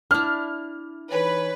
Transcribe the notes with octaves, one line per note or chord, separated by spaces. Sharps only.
D4 E4 F6
E3 D#4 B4 C#5